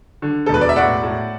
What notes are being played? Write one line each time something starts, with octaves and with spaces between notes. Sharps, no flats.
D3
A4
E1 B4
D5
E5
A2 D5 F#5
A2